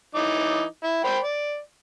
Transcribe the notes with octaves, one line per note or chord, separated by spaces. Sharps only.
E3 D#4 D6
E4
C5 G5 B5
D5